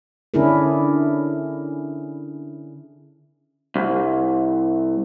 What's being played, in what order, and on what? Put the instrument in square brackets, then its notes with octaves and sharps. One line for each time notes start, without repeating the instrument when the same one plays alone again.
[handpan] D3 C#4 D4 E4 G#4 A#4
[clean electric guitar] C2